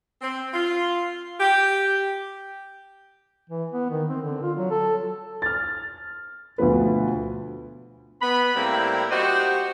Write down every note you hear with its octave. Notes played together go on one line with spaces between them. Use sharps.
C4
F4
G4
E3
B3
D#3
C4
D3
F4
F#3
A4
F6 A6
D2 B2 F3 B4
B3 B5
A2 G3 A#3 C4 E4 G4
F#4 G4 C5 D#5 F#5